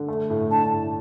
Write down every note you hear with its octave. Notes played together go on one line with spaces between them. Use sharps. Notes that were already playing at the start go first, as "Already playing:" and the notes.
Already playing: D3
A3
A2
D4 A5
A2